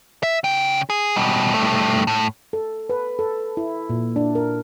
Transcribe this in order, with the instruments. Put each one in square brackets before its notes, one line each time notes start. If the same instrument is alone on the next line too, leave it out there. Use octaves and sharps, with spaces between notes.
[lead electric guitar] E5
C#3 G5
G#4
B2 G3
G2 A3
A2
[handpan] A4
B4
A4
E4
A#2
D4
A#4